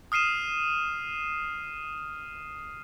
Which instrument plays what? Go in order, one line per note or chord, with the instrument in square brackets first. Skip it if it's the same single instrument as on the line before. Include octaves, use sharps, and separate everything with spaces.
[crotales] D#6 F6 C7 D#7 E7